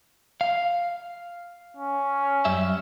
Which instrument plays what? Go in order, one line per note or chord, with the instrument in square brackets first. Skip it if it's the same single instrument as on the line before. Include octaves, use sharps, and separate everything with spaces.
[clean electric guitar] F5
[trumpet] C#4
[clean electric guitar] F#2 G3 E5